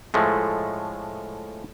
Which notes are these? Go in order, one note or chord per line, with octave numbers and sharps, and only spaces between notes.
A2 F3 G#3 A3